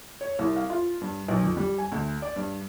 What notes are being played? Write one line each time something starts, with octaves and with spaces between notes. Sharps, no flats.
C#5
C2
F5
F4
G2
B1
F2
G3
G#5
D2
D5
G2